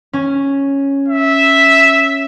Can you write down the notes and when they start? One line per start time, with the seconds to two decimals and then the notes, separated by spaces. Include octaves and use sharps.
0.13 C#4
1.09 E5